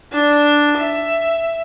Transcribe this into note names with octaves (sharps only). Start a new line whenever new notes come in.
D4
E5